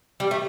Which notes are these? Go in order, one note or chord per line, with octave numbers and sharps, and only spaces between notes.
G3
A3